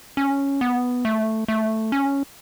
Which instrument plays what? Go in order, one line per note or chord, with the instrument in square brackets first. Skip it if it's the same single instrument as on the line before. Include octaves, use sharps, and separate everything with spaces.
[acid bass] C#4
B3
A3
A3
C#4